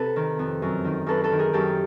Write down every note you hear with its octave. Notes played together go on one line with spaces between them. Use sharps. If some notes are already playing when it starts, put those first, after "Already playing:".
Already playing: C3 A4 B4
D#3
F2
F#2
D#3
F#2 A4 B4
A4 B4
D#3
G#4 A#4
F#2 G4 A4